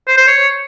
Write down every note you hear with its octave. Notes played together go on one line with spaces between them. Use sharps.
C5
C5
C#5